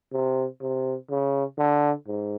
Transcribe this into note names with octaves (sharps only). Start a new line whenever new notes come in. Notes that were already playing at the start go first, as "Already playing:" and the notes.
C3
C3
C#3
D3
G#2